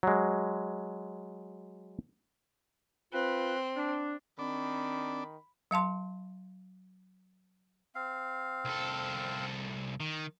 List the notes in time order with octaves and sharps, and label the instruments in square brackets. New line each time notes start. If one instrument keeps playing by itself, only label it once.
[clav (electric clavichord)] F#3 G#3
[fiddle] C4 [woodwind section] F4 B4
[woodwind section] D4
[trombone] D#3 [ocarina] C4 [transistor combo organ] D4 [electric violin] B5
[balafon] F#3 F5 A5 C6
[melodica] C4 F5
[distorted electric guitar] C2 A4
D#3